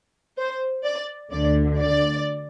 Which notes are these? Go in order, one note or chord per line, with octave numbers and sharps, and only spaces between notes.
C5
D5
D2 D3 D5
D5